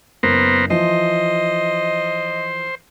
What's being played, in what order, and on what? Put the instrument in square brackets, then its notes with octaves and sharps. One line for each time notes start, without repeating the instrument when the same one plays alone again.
[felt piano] F#1 [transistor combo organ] B3 A#4 C5
[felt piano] E3 F3 [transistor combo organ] C5 [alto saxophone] D#5